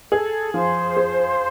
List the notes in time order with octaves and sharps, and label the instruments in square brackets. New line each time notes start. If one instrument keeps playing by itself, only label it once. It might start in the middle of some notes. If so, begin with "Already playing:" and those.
[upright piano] G#4 [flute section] A4
[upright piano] F3 [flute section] C5
[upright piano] G#4